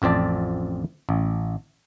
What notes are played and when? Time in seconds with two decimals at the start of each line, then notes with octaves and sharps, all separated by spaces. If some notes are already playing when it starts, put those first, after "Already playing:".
0.02 A1 F2 C4 D5 A5
1.09 A1